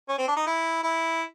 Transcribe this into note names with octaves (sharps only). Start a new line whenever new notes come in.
C#4
C4
D4
D#4
E4
E4